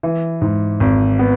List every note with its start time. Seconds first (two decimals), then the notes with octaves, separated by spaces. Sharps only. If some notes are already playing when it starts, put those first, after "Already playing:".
0.03 E3
0.41 G#2
0.80 G#1
1.19 B3